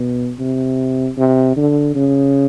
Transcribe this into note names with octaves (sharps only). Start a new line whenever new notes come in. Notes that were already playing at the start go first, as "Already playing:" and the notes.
Already playing: B2
C3
C3
D3
C#3